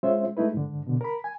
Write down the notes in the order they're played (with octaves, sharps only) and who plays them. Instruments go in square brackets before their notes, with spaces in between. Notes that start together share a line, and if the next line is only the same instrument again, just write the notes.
[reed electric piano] G#3 C#4 F4 C5 E5
G#3 A3 D#4 E4 B4
G#2 D3
B2 D3
A#4 B5
G#5